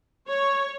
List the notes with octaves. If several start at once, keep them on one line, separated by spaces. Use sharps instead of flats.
C#5